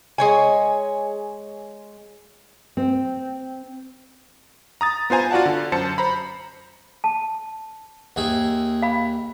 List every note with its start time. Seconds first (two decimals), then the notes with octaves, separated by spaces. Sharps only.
0.18 G#3 C#5 G#5
2.77 C4
4.81 A#5 D#6 A6
5.10 B3 F4 C5 G#5 A#5
5.31 F4 F#4 D5 F#5 A5
5.46 D3
5.72 F#2 C5 A5 C#7
5.98 C5 A#5 B5
7.04 A5
8.16 D#2 G#4 E5
8.82 F5 B5